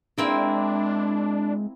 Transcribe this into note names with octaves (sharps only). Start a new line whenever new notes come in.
G#3 A#3 C4 D4 E4